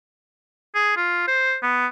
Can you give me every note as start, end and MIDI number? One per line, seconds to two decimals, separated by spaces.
0.75 0.92 68
0.97 1.24 65
1.27 1.56 72
1.63 1.87 59